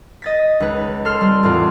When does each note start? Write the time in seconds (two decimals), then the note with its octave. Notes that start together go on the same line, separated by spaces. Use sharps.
0.22 D#5 A6 B6
0.60 C#2 D#4 B4
1.05 A4 C6 F6 C7
1.21 G3 C4
1.43 E2 A2 C4 F4